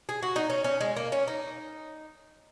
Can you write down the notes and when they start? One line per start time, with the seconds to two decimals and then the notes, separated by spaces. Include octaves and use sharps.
0.09 G#4
0.23 F#4
0.36 D#4
0.50 C#4
0.64 C#4
0.81 G#3
0.96 A#3
1.12 C#4
1.28 D#4